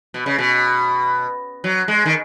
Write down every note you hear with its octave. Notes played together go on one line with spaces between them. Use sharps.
B2
C#3
B2
F#3
G#3
D#3